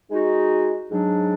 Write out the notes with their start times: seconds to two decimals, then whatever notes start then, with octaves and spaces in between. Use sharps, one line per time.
0.09 G#3 D#4 F#4
0.89 G#2 F#3 D4